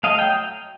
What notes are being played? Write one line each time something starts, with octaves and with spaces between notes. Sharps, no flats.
A3 D#5 F5
F#3 G5